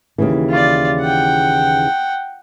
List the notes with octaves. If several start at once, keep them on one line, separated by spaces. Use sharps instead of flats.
D#2 C#3 E3
F4 D5
F#5 G5